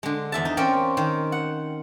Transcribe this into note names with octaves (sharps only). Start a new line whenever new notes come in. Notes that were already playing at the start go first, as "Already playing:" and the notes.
D3 G#3
E2 E5 A5
D#4
C4 C#4 A#4 D5 F5 G5
D#3
F#5